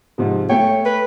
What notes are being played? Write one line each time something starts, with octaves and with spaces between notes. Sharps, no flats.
G#2 C3 F3
A3 C#5 G5
B4